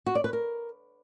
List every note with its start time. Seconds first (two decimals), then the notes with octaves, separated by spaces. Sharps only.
0.06 F#4
0.15 D5
0.24 B4
0.33 A#4